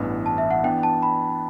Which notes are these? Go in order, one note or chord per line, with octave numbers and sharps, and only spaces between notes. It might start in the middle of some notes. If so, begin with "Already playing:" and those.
Already playing: A1 G2 E3 B3
A5
E5
F#5
E3 B3 D4 G5
A5
B5